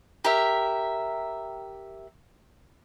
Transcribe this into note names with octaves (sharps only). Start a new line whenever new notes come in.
G4 A#4 E5